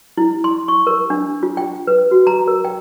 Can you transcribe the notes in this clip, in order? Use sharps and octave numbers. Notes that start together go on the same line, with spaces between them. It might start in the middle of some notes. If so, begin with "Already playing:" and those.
E4
C6
C#6
A#4
D4
F4
G5
B4
F#4
A#5
A#4
G5